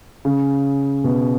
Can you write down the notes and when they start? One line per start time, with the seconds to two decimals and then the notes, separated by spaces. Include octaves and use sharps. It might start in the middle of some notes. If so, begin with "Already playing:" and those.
0.25 C#3
1.04 B2